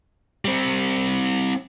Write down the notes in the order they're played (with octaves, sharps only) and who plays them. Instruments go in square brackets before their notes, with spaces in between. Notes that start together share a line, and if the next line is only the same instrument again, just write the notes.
[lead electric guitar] G3 C4